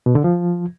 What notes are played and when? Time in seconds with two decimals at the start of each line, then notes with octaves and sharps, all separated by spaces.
0.06 B2
0.15 D3
0.24 F3